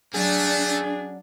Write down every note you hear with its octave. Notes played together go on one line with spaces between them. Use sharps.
F#3 A3 C#4 D4 G#4 D5